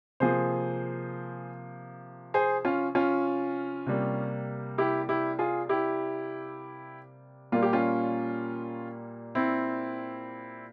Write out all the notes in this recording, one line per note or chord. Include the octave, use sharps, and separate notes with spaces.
C3 F3 A#3 G#4 C5
G#4 C5
C#4 F4
C#4 F4
C3 G3 A#3
E4 G4
E4 G4
F4 G#4
E4 G4
A#2 G3 A#3 F4
G4
C#4 F4
C4 E4